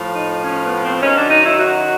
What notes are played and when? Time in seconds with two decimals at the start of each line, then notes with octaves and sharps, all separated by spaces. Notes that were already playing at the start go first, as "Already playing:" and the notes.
Already playing: A2 F3
0.14 D#4
0.43 C#4
0.63 B3
0.82 C4
1.01 F#2 D#3 F#3 C#4
1.16 D4
1.30 D#4
1.45 E4
1.58 F#4